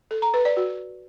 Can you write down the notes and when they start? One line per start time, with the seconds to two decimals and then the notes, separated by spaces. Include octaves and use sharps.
0.11 A4
0.22 A#5
0.34 B4
0.45 D5
0.57 F#4